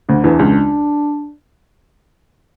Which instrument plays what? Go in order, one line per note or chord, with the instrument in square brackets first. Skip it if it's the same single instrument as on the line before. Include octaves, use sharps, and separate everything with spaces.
[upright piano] D2 D3
[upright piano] E2 E3 [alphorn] D4
[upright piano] C#2 C#3